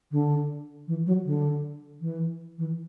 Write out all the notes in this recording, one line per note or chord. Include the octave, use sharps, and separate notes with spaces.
D3
E3
F#3
D3
E3
E3